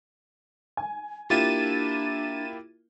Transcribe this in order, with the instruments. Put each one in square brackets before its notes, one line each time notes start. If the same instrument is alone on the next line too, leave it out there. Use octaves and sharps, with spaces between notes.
[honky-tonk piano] G#5
[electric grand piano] A#3 E4 G4 [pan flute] D4 [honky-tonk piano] F4 [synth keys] A6 D#7 E7